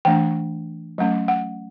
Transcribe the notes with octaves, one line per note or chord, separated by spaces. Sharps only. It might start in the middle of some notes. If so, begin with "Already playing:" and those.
E3 A3 D4 G5
F#3 A3 C#4
F#5